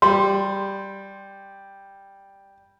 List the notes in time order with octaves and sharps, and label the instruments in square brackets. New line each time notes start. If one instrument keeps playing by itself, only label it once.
[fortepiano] G3 [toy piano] C6